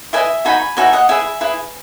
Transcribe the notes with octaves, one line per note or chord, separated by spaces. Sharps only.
E4 B4 D#5 E5 G#5
D#4 F#4 B4 G#5 B5
D#4 F#4 B4 E5 G#5
D#5 F#5
E4 G#4 B4 E5 G#5
E4 G#4 B4